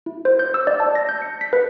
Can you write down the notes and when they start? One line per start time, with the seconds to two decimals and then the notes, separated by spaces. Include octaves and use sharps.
0.06 E4
0.25 C5
0.39 G6
0.54 E6
0.67 D5
0.80 A5
0.95 A#6
1.09 G6
1.22 C#7
1.41 B6
1.53 B4